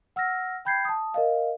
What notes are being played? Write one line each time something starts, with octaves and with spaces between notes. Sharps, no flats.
F#5 E6 F6 A#6
G5 B5 G6 G#6 C7
A5 D#6
A#4 D#5 F5